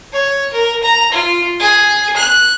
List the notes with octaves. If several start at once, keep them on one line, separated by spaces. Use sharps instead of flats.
C#5
A#4
A#5
F4
G#4
F#6